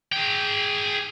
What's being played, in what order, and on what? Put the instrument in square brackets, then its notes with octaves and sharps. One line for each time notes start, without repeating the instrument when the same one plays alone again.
[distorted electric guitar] G#4 G5